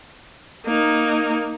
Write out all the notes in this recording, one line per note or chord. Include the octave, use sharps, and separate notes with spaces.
A#3 D#4